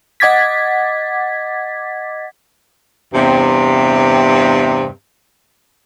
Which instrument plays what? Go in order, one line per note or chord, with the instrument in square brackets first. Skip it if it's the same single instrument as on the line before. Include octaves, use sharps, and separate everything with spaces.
[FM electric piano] D#5 F#5 D6 G#6 A6 B6
[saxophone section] E2 G2 C3